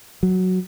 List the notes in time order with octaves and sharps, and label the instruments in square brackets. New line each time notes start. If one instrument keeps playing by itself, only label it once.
[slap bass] F#3